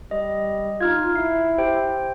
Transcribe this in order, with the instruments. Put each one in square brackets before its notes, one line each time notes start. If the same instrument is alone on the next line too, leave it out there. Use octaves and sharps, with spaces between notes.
[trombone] G3 [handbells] D#5
[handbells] D#4 F6 G#6 [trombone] F4
[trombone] E4 [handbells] C7
[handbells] G4 C5 G5